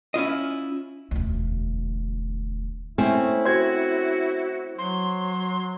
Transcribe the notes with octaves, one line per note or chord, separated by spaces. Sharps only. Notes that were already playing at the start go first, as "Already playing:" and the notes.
C#4 E4 F4 D#5
E1 D2
A3 C4 C#4 E4
F#4 C5 G#6
F#3 C6